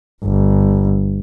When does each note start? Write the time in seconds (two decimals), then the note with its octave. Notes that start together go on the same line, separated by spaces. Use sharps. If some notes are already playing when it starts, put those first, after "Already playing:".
0.25 G1